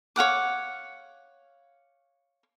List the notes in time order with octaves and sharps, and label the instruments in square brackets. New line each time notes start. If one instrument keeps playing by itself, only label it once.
[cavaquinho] C#5 F5 F#5 D6